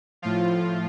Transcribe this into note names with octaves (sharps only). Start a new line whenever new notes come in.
A2 F3 F4